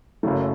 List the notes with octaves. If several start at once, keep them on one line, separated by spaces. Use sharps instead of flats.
F#1 F#2 C#3 F#3 A3